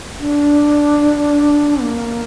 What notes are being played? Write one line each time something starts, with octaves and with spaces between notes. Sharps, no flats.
D4
A#3